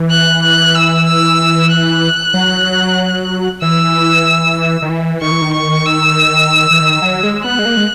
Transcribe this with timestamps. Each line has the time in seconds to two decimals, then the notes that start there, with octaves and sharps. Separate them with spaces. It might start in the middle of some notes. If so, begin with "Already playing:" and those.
Already playing: E3
0.10 F#6
0.43 F#6
0.74 E6
1.06 E6
1.71 F#6
2.34 F#3
3.62 E3 E6
4.82 D#3
4.89 E3
5.21 D#3 C#6
5.31 E3
5.42 D#3
5.53 C#6
5.86 E6
6.71 E3
6.80 D#3
7.02 F#3
7.23 G#3
7.44 B3 F#6
7.59 G#3
7.65 A#3
7.77 G#3